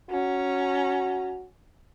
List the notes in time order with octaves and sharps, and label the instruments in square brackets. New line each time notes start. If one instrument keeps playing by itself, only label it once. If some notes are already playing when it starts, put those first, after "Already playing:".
[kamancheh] C#4 A#5 [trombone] F#4